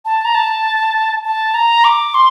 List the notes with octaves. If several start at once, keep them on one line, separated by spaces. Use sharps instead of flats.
A5
A#5
A5
A5
A#5
D6
C6